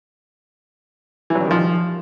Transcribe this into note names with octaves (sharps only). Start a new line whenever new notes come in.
E3
F#3
G3
D#3
F3